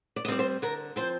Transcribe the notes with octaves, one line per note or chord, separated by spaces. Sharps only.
D5
D#5
G3 C4 D5
C5
D3 A#4
F3 C4 C5